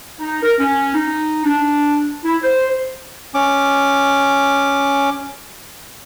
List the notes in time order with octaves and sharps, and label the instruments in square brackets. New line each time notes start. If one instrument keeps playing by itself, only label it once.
[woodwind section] D#4
A#4
C#4
D#4
D4
E4
C5
[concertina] C#4 D6